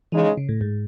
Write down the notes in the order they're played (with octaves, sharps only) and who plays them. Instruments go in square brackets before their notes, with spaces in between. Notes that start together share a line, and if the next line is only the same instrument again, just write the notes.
[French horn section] C#3 G#3 D#4 [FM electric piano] E3
[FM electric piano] C#3
A2
G#2